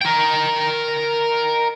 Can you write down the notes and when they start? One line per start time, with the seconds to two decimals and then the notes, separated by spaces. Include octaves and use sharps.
0.01 A#4 G5